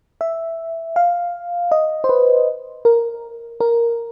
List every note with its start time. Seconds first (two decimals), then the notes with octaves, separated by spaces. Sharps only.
0.21 E5
0.96 F5
1.71 D#5
2.04 C5
2.09 B4
2.85 A#4
3.60 A#4